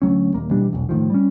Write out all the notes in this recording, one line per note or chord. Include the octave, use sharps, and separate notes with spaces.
D2 F#3 C#4
D#1 A#3
B2 E3 G3 D4
E1 B1
A2 D#3 F3
G3 C#4